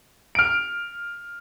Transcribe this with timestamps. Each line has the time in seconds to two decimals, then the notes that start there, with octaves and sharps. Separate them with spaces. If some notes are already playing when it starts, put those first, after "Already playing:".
0.35 F6 D7